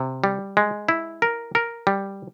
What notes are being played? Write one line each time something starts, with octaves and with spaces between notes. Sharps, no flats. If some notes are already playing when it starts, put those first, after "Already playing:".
Already playing: C3
G3
G#3
E4
A#4
A#4
G3